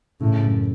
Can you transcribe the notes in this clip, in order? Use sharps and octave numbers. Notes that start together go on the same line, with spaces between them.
A2 C#3
F#2